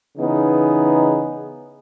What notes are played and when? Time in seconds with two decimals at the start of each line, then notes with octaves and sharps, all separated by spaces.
0.16 C#3 E3 B3 D#4 G#4